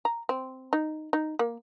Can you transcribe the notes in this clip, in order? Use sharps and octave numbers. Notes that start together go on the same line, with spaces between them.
A#5
C4
D#4
D#4
A#3